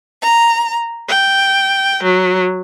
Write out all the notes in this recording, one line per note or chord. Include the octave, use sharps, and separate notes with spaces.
A#5
G5
F#3